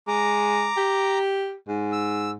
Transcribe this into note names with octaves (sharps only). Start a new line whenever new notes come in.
G#3 A#5 D6
G4
G#2
E6